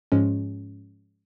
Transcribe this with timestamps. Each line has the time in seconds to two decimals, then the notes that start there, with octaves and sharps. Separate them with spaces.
0.12 G#2 F3 G#3 C#4